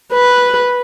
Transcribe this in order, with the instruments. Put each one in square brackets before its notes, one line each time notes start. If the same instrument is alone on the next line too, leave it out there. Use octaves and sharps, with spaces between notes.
[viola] B4